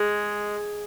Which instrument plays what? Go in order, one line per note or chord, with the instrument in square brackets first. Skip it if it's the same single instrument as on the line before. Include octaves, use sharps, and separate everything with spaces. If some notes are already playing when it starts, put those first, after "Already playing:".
Already playing: [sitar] G#3